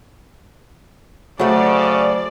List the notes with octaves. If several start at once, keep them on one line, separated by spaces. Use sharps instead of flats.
C#3 F#3 A3 C5 D5 E5 F#5